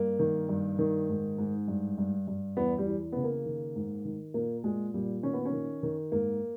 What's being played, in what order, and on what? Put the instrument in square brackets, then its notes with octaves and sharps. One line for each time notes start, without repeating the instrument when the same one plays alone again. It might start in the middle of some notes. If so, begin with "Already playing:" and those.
Already playing: [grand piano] G2 A#3
D#3
G2
D#3
G#2
G#2
G2
G2
G2
E2 B3
G3
E3
C#3 B3
A#3
D#3
G#2
D#3
A#2 A#3
A#2 G#3
A#2 G3
D#3 C#4
B3
C#4
D#3
D#3
G#2 A#3